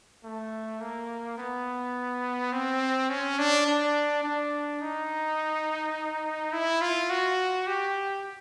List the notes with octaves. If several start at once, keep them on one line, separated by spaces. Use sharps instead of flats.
A3
A#3
B3
C4
C#4
D4
D4
D4
D#4
E4
F4
F#4
G4